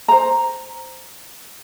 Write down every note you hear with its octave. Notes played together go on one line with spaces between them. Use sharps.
C5 A#5